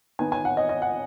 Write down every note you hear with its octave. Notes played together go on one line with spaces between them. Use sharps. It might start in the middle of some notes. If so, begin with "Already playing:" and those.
D#3 B3 D#4 G#5
G#5
F#5
D#5
D#5
F#5